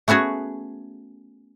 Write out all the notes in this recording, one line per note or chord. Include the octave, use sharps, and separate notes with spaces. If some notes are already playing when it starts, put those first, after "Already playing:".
A3 B3 C#4 F#4 G#4